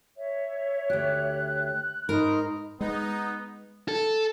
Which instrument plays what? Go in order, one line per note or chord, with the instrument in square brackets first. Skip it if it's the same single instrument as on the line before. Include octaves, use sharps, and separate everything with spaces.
[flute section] C#5 E5
[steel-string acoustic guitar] D2 G4 [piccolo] F#6
[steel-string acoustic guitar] G#2 A#4 [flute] D#4 [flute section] B5 C6
[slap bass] G#3 [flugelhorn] B3 [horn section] D#4
[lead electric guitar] A4